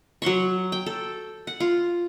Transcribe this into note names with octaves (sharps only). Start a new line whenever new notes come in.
F#3 F#5 C6 C#6
G5
A4
F#5
F4